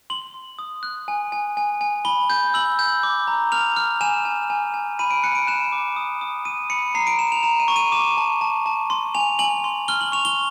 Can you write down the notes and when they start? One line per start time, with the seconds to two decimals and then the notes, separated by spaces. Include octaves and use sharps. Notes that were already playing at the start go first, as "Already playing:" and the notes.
0.10 C6 F#7
0.34 C6
0.59 D#6
0.83 F#6
1.08 G#5
1.32 G#5
1.57 G#5
1.81 G#5
2.05 B5 G7
2.30 G6
2.54 E6 F#7
2.79 G6
3.03 D6
3.27 A#5
3.52 F6 F7
3.76 F6
4.01 G#5 E7
4.25 G#5
4.50 G#5
4.74 G#5
4.99 B5 D#7
5.11 D7
5.23 F#6 C#7
5.35 D7
5.47 F#6 E7
5.72 D6
5.96 D#6
6.21 D#6
6.45 D#6 D#7
6.70 B5 C#7
6.95 A#5 C7
7.07 D7
7.19 A#5 E7
7.32 F7
7.43 A#5 E7
7.60 D#7
7.68 C#6
7.76 D#7
7.92 D6 E7
8.17 A5
8.41 A5
8.66 A5
8.90 C6
9.15 G#5 F7
9.39 G#5 F#7
9.64 C6
9.88 F6 G7
10.01 F#7
10.12 C#6 F7
10.25 G7